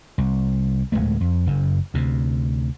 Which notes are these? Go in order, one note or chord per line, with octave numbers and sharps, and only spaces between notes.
C2
D1 B1 G#3 A3
F2
F#1 F#2
D2 C3